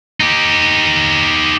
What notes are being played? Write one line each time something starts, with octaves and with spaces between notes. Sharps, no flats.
D#4 G4